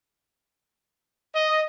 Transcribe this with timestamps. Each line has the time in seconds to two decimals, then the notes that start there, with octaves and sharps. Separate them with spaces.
1.34 D#5